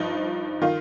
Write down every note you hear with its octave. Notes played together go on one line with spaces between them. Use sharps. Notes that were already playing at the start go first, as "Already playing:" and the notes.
Already playing: G2 F3 D#4
D#3 F4